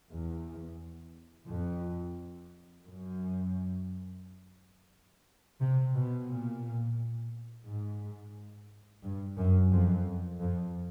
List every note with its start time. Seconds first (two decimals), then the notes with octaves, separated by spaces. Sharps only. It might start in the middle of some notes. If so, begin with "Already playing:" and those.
0.11 E2
1.48 F2
2.85 F#2
5.60 C3
5.94 B2
6.28 A#2
7.66 G#2
9.03 G2
9.38 F#2
9.72 F2
10.40 F2